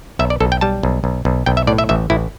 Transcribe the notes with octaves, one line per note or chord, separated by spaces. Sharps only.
B1 E5
D5
B1 A4
G5
G3 A5
B1
B1
B1
B1 G5
E5
A2 D5
E5
A1 E5
A1 E4